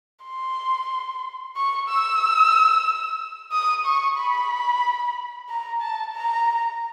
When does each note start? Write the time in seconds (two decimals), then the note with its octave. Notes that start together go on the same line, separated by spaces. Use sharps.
0.25 C6
1.56 C#6
1.89 E6
3.52 D#6
3.85 C#6
4.18 B5
5.49 A#5
5.81 A5
6.14 A#5